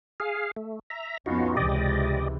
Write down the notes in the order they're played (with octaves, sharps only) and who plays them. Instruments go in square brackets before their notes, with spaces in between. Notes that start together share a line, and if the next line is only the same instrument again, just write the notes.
[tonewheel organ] G#4 F5
A3
E5 A#5
[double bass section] F2 B3 C#4 [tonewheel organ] D#4 F4 F#4
[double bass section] C#2 C3 E3 [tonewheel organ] G4 D5 D#5